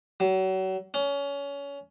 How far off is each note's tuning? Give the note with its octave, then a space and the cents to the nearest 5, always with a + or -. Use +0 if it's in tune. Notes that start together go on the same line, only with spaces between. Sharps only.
F#3 +35
C#4 +25